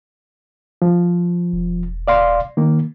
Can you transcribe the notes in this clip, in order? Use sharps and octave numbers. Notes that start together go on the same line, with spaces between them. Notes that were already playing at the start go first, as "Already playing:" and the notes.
F3
E1
D5 F5 C6
D#3 A#3